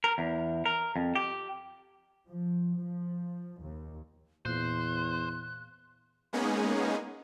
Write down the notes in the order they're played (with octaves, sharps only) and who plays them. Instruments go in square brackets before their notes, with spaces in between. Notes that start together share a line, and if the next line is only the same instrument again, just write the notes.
[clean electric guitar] A#4
E2
A#4
F2
G4
[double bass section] F3
F3
D#2
[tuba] E2 [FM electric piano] A#2 [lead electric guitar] C5 [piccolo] F#6
[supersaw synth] G#3 A#3 B3 C#4 D#4 G#4